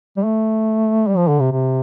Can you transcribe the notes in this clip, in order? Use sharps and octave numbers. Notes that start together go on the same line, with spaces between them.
G3
A3
G3
F3
D3
C3
C3